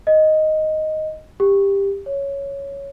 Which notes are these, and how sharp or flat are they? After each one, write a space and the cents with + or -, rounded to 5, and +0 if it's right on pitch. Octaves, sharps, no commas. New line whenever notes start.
D#5 +0
G4 +15
C#5 +5